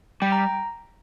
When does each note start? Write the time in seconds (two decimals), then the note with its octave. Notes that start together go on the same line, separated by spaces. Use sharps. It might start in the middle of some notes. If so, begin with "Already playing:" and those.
0.22 G3 G5
0.32 A#5